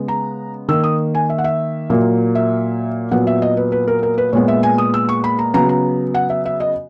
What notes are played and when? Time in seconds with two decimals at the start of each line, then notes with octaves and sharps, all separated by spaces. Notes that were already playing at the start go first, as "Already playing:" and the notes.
Already playing: C#3 G#3 B3
0.08 A#5
0.68 D#3 A#3 E6
0.84 D#6
1.15 G#5
1.30 E5
1.38 F#5
1.44 E5
1.90 A#2 F#3 A#3
2.35 E5
3.11 A#2 F#3 B3 F#5
3.27 E5
3.42 D#5
3.57 B4
3.72 B4
3.88 A#4
4.03 A#4
4.18 B4
4.33 A#2 G#3 B3 C#5
4.48 E5
4.63 G#5
4.78 D#6
4.94 E6
5.09 C#6
5.24 B5
5.39 A#5
5.54 C#3 F#3 B3 A#5
5.69 A#5
6.14 F#5
6.30 E5
6.46 E5
6.60 D#5